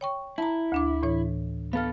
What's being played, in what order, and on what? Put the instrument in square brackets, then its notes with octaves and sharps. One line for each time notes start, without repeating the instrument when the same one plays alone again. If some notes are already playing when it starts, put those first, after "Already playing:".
[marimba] C#5 G5 C#6
[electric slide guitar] E4 [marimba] A5 A#5
[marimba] D2 D4 D6
A2 E3 C#5
[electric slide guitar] B3 A4 [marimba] F5 F6